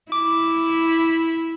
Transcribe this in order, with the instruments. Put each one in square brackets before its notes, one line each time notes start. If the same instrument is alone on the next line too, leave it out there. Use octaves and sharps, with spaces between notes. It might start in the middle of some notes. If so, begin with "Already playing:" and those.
[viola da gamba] E4 [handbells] D6